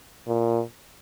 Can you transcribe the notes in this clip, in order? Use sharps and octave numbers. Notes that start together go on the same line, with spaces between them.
A#2